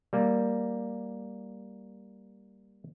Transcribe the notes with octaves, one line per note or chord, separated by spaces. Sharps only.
G3 A#3